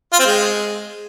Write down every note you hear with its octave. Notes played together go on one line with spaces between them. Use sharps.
F4
C4
G#3